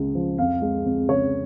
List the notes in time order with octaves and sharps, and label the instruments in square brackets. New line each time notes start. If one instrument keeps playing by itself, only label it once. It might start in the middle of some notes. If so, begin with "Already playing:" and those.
Already playing: [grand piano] C#2 C#3 G#3
F3
F2 F5
G#3
F2
C#3 C#5